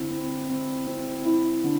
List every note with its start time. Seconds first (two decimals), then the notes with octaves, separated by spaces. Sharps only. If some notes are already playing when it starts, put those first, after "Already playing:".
Already playing: D3 C4 E4
0.11 C4
0.49 C4
0.87 C4
1.25 E4
1.64 D3